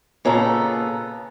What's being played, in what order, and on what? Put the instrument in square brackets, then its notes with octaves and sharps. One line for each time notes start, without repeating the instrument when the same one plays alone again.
[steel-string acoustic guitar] A#2 C#3 B3 A4 A#5